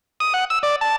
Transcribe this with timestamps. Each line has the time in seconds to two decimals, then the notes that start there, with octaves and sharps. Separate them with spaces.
0.20 D#6
0.34 F#5
0.50 E6
0.63 D5
0.81 A5